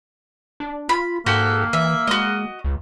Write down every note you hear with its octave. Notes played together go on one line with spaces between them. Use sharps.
D4
F4 B5
G#2 A#3 F#4 G4 A4
E3 E5
G#3 F#4 D#5
C#2